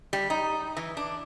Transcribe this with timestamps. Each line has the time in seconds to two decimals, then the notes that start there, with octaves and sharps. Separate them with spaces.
0.13 G3
0.30 D#4
0.77 E3
0.97 D4